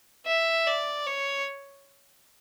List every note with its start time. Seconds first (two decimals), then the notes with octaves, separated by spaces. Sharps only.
0.26 E5
0.67 D5
1.06 C#5